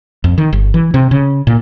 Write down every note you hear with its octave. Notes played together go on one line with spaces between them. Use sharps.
F2
D#3
G1
E3
C3
C#3
A#2